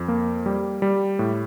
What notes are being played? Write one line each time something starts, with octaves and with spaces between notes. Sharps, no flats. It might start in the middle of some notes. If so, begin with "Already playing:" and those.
Already playing: F2
A#3
G3
G3
A2